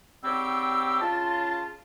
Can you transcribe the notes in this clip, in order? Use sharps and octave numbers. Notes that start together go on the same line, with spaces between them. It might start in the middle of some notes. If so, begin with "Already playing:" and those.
G#2 G3 C4 G4 C#5 E6
C#3 F4 A5